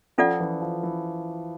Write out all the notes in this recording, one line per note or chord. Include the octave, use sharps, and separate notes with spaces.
F3 C#4 F4 A4 D5 F#5
E3
F3
E3